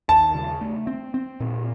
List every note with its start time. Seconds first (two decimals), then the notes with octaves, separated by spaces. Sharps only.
0.09 D#2 A5
0.35 C#3
0.61 A3
0.87 C4
1.14 C4
1.40 A#2